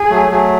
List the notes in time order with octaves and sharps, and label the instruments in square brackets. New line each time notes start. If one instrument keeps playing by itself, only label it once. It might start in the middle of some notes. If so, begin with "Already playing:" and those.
Already playing: [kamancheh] G#4
[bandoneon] F#3 A3
F#3 A3